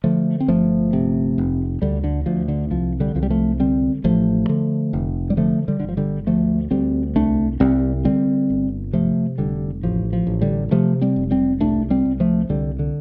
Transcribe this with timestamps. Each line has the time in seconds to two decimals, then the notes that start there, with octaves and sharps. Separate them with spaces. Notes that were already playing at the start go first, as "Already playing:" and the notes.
0.04 D3 F3 A3
0.40 C4
0.48 G1 F3 A3
0.93 C3
1.38 F1
1.82 D2 D3 G3
2.04 D3
2.26 D2 F3
2.48 D3
2.71 C2 F3
3.00 D3 G3
3.15 C2 F3
3.23 G3
3.30 F3 A3
3.60 D3 G3 C4
4.04 A1 F3 A3
4.49 D3
4.93 F1
5.30 G3
5.37 D3 F3 A3
5.68 D3 G3
5.80 G1 D3
5.89 F3
5.97 D3 G3
6.27 D2 F3 A3
6.71 D2 G3 C4
7.16 C2 A3 D4
7.60 C2 G3 C4
8.04 D3 G3 C4
8.50 G1
8.93 C3 F3 A3
9.38 F1 D3 G3
9.83 A1 F3
10.13 F3
10.27 A1
10.42 D3 G3
10.71 C3 F3 A3
11.01 G3 C4
11.16 F1
11.31 G3 C4
11.60 C2 A3 D4
11.90 G3 C4
12.05 C2
12.20 F3 A3
12.49 C2 D3 G3
12.79 D3